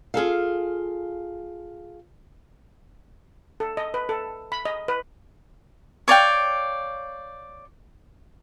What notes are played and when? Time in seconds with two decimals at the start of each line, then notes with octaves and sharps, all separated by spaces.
0.14 F4 G#4 A4 F5
3.60 A4
3.77 D#5
3.94 B4
4.09 A4
4.52 B5
4.65 D#5
4.88 B4
6.08 C#5 D5 F5 G5